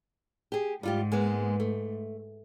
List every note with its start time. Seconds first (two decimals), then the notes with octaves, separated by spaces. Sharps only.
0.52 G4 G#4
0.83 G#2 G3 F4 G4
1.12 G#3 A#3 B3
1.60 A3